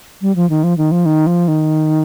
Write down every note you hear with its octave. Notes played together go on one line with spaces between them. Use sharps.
G3
F3
D#3
F3
D#3
F3
D#3
F3
D#3